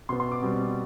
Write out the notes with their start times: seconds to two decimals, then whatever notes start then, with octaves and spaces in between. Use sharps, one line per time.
0.09 B2 B3 C6
0.20 C6
0.32 D6
0.43 B2 G3 C4